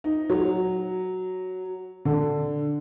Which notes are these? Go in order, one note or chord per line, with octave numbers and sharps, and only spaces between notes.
D#4
F#3
D3